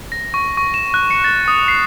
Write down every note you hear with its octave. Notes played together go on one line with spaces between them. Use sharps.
A#6
C#6
C#6
E7
F#6
C#7
A6
D#6
C7